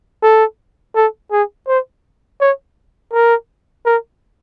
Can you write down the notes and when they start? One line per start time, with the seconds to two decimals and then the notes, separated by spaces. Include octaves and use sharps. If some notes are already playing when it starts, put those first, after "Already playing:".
0.23 A4
0.95 A4
1.32 G#4
1.68 C5
2.40 C#5
3.13 A#4
3.85 A#4